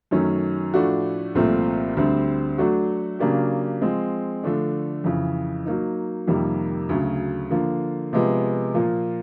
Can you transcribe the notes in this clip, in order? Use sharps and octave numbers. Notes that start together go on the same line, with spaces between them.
F#2 D#3 F#3 A3 C#4
A2 F3 A3 D4 F#4
C2 A#2 F3 A3 C4
D2 D3 G3 C4
F#3 A3 D4 F#4
C#3 F#3 A#3 D4 G4
F3 G#3 C4
D3 F3 A3 D4
F2 C#3 E3
F#3 A#3 D#4
F2 C3 D#3 G3 A#3
D2 C#3 F#3
D3 F3 A#3
C3 F3 G#3 B3
A#2 F3 A#3